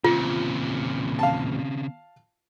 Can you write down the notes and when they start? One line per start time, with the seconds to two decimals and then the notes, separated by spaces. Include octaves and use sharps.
0.04 E2 A#2 C#3 C4 F4
1.19 F5 A5